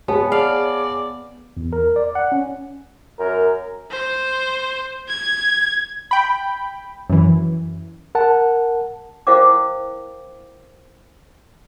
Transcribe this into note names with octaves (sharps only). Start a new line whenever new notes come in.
B3 G#4 C#5 A5
D5 F5
E2
A#4
D5
F#5
C#4
F#2 A#4
C5
G#6
G5 B5
F#2 E3
A#4 F#5 A5
E4 A#4 C5 F5 G5 D6